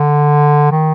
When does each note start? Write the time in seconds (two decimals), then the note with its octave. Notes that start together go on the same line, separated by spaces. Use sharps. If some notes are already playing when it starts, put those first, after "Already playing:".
Already playing: D3
0.71 D#3